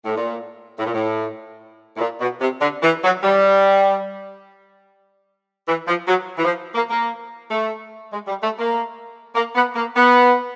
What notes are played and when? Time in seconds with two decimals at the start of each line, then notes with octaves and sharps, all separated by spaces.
0.05 A2
0.17 A#2
0.78 A2
0.86 A#2
0.94 A2
1.97 A2
2.00 A#2
2.21 B2
2.41 C3
2.61 D3
2.83 E3
3.03 F#3
3.23 G3
5.68 E3
5.88 F3
6.08 F#3
6.38 E3
6.45 F3
6.75 A#3
6.90 A#3
7.51 A3
8.13 G#3
8.27 G3
8.43 A3
8.59 A#3
9.35 A#3
9.55 B3
9.75 A#3
9.96 B3